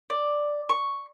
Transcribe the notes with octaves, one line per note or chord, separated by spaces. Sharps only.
D5
C#6